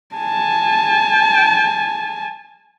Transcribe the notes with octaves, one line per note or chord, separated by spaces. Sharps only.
G#5 A5